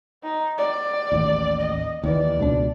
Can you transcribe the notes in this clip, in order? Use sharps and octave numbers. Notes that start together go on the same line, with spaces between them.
D#4
D5
A1 D#2
D#5
D#2 D#3 E3 D5
C#2 B2 D4